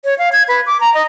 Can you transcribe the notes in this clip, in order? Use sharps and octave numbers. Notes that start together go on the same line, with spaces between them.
C#5
F5
G#6
B4
D6
A#5
D#5